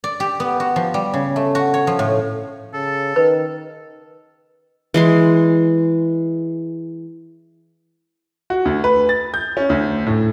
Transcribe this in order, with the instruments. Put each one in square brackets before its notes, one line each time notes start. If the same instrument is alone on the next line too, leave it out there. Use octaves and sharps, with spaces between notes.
[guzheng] D5
G4
B3
F#4
F3
G3
C#3
A3
F#4
C#5
F3
A2
[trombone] C#3 [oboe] A4
[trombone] D#3 [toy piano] B4
[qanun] E3 G#3 C6
[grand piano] F#4
D2
B4
A6
G6
C#4
D2
A2